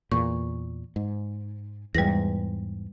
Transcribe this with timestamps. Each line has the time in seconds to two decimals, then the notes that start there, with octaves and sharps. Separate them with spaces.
0.12 E2 A#2 C#6
0.96 G#2
1.95 E2 G#2 G3 B4 A#6